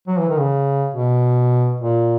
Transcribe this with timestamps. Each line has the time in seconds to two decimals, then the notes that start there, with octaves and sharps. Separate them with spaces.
0.07 F#3
0.18 E3
0.29 D#3
0.40 C#3
0.94 B2
1.81 A#2